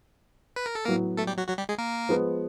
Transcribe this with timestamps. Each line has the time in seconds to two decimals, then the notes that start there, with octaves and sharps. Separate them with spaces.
0.56 B4
0.66 A#4
0.75 A4
0.85 A2 F#3 A#3 B3 A#4
1.17 A3 A4
1.27 G3 G4
1.37 F#3 F#4
1.48 F#3 F#4
1.58 G3 G4
1.69 G#3 G#4
1.78 A#3 A#4
2.09 F3 G#3 B3